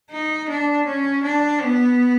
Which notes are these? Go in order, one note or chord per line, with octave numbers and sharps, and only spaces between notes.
D#4
D4
C#4
D4
B3